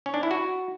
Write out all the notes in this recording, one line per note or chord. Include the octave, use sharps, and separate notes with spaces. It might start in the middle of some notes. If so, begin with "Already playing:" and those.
C#4
D4
E4
F#4